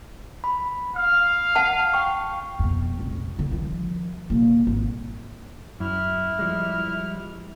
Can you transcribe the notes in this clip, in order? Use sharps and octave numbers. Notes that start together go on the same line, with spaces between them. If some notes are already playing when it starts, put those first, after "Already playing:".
B5
F5 F6
F#5 A5
G5 C#6
F2 B2
F1 A#1
D3
D#3 F3
B2 A#3
G#1
F#2 E4 F6
F3 G3 G#3